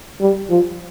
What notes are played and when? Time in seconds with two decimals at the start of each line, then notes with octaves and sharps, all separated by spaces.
0.21 G3
0.50 F3